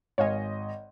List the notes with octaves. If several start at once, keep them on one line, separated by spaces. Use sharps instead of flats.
G#1 C#5 D#5 F5 G#5